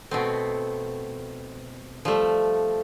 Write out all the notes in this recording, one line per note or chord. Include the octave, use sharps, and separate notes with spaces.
B2 A3 C4
F3 G3 A3